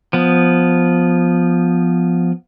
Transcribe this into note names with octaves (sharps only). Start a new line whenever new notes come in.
F3 B3